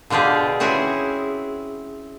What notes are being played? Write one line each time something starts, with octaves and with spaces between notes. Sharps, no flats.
B2 D3 F4 G4 G#4
C4 C#4 E4 F#4 G#4